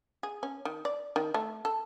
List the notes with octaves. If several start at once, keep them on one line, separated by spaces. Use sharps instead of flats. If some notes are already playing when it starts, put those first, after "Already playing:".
G#4
C#4
D#3
D5
D#3
A3
A4